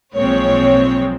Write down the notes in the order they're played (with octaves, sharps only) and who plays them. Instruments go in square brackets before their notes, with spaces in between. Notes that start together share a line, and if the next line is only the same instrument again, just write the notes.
[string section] B1 A#2 F3 G#3 C4 C#5